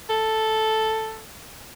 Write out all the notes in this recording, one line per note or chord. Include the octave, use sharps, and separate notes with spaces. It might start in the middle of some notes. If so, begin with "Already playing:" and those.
A4